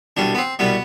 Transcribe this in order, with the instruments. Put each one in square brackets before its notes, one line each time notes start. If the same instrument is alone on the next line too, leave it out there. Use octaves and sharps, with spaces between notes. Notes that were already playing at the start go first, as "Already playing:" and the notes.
[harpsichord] C2 B2 G3 D4
B3
C4
C2 B2 G3 B3